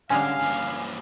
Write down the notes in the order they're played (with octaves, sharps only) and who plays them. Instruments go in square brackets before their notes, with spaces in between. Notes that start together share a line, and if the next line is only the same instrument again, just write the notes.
[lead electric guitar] D3 [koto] G3 G#3 C#4 [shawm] F5 [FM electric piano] G#5
[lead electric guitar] G2 A#3